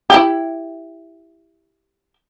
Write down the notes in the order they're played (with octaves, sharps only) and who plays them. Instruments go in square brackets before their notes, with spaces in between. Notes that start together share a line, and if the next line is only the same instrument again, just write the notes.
[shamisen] E4 G4